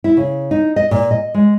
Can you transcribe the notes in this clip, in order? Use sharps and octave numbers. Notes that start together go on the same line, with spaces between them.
E4
C#3
D#4
D#5
A#2
D#5
G#3